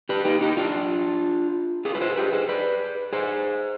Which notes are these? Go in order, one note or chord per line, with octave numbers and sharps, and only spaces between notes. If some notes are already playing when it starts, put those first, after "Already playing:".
G4 B4
D#4 G4
D#4 G4
D4 F4
F4 G#4
B4
G#4 C5
G4 B4
G#4 C5
B4 D5
G#4 C5